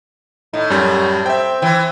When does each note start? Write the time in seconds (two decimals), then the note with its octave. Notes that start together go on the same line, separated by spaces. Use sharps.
0.54 A2 D#4
0.70 F#2 F#3 G3
1.26 C4 E5 G5
1.62 E3 C4